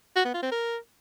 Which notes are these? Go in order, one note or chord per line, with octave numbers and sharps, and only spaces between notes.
F#4
B3
F4
C4
A#4